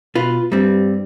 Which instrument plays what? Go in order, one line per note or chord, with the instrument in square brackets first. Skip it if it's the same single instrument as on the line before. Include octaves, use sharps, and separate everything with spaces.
[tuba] B2 [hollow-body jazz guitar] F4 B4
[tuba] G2 [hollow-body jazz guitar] G3 C4